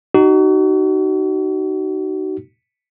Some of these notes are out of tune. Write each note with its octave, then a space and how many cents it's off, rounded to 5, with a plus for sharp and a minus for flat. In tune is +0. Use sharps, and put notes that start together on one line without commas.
D#4 -15 F#4 +35